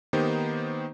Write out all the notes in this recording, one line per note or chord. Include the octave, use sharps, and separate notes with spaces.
D#3 A#3 B3 D#4 G4 C5